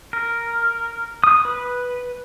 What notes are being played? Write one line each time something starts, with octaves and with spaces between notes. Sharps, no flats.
A#4
D#6
B4